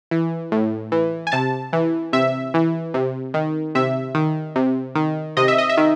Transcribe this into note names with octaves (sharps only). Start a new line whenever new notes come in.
E3
A2
E3
G#5
C3 A5
E3
C3 E5
E3
C3
D#3
C3 E5
D#3
C3
D#3
C3 D#5
E5
D#5
E5
D#3